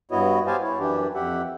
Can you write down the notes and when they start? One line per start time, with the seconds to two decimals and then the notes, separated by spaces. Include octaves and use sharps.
0.11 G2 B3 E4 F#4 C#5 D#5
0.47 B3 G4 C5 F5 G#5 A5
0.63 E4 C#5
0.80 F#2 E3 D4 G4
1.15 F2 G4 E5 F#5